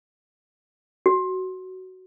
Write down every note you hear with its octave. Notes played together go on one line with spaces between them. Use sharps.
F#4